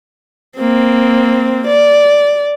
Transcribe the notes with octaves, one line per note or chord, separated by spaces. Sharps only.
A#3 C4
D5